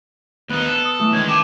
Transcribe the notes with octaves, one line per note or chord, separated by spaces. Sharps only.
D#2 B3 D#4 B4 F#6
A4
D#6
E3 A3
C#2 D#3 G#3 C#4 G6 G#6
G5 A5 D6